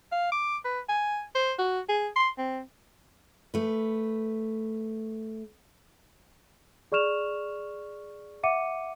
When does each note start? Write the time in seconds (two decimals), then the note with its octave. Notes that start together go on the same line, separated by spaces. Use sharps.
0.12 F5
0.32 D6
0.65 B4
0.89 G#5
1.35 C5
1.59 F#4
1.89 G#4
2.16 C6
2.38 C4
3.54 A3 B4
6.92 G#4 D5 C#6 F6 E7 F7
8.43 E5 F#5 D6 C#7 D#7